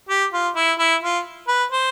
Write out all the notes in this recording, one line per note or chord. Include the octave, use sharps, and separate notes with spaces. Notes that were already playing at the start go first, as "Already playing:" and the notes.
G4
F4
E4
E4
F4
B4
C5